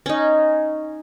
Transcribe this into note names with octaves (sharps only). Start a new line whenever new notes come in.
C#4 D#4